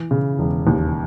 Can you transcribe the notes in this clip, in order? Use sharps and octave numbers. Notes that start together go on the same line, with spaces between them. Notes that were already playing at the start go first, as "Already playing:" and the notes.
Already playing: E3
C#3
E1
D#2